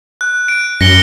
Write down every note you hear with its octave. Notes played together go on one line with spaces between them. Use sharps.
F#6
D7
F#2 A#6 C#7 G7